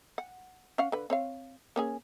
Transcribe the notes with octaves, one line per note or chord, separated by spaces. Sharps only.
F#5
C#4 F5 F#5
D3 B4
C4 C#5 F5
A#3 C#4 G#4